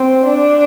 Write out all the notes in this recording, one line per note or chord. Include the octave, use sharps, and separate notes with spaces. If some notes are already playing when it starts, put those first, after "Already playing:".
Already playing: C4
D4